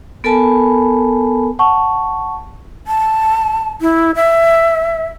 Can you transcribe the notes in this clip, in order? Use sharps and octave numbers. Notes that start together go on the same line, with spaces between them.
B3 A4 A#4 G#5 A5 B5
F#5 A5 C#6
A5
E4
E5